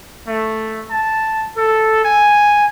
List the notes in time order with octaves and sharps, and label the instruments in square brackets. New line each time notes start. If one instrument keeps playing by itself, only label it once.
[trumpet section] A3
A5
A4
G#5